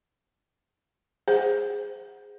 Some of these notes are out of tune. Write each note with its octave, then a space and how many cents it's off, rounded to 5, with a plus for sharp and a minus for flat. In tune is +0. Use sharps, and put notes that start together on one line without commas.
G#4 -15 C5 +0 F#5 +0